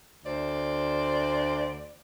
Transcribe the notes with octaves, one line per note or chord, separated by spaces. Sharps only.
D2 C5 D5